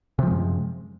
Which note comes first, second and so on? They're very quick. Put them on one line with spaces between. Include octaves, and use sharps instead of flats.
C3 F3 G#3 F#2